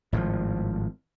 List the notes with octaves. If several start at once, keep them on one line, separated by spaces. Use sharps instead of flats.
G#1 A2 D3 F3